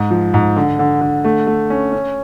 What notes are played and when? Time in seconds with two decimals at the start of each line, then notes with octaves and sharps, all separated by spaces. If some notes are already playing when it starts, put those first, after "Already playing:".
Already playing: G#2
0.11 F3
0.34 G#2
0.56 D3
0.79 D3
1.01 D3
1.24 A3
1.47 A3
1.70 C#4
1.93 C#4